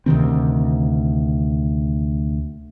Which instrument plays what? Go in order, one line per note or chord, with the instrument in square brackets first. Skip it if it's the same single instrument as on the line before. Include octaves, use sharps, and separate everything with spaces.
[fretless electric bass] D2 C3 D#3 C4